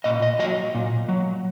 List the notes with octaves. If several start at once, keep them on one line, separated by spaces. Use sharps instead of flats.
A#2 D#5
D#5
F#3 D#5
A#2
F#3